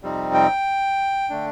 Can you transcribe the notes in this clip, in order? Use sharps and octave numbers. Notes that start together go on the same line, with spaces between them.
F2 C3 G3 C4 D#4
G5
D3 A3 D4